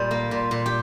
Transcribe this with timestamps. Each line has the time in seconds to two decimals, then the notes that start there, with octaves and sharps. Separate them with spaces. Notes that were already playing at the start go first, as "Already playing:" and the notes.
Already playing: A#2 G3
0.11 A#3
0.31 A#2
0.51 A#2
0.66 G4